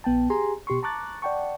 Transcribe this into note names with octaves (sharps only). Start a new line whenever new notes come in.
A#1 B3 G5 A5
G4 G#4 G#5 A#5 C6
B2 G4 C6 C#6
A5 A#5 C#6 D6 F#6 A6
D5 F#5 G5 A5 C#6